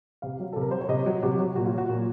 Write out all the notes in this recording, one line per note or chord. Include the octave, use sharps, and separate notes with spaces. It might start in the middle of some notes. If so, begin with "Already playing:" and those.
C3 F5
F#3
C3 A4
A#4
F#3 C5
C#5
C3 D#5
F#3
C3 F#4
F#3 F#4
A#2 F#4
F4
F#3 F#4
A#2